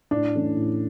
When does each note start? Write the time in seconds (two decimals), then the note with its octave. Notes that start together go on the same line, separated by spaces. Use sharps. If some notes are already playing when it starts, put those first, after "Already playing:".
0.11 A2 D4
0.34 E3 A3 C#4
0.57 A2